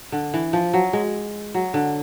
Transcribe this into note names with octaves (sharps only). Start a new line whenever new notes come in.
D3
E3
F3
F#3
G#3
F#3
D3